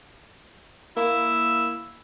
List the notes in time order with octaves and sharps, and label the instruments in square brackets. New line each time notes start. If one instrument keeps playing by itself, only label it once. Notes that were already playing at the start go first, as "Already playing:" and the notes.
[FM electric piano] A#3 [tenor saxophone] E4